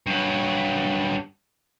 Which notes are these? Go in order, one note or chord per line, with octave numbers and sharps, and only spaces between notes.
G2 F#3